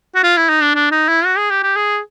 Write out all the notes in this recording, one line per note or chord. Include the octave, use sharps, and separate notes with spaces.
F#4
F4
E4
D#4
D4
D4
D#4
E4
F#4
G#4
G4
G4
G#4